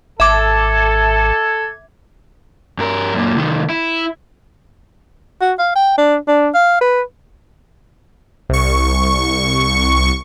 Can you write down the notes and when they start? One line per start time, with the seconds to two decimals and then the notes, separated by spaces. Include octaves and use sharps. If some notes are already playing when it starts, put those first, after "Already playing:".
0.20 G#1 A4 E5 D6 G#6
2.79 G2 A#4
3.14 F#2 A#2
3.36 C2 D#3
3.70 E4
5.41 F#4
5.59 F5
5.75 G5
5.98 D4
6.28 D4
6.55 F5
6.81 B4
8.49 C2 C#6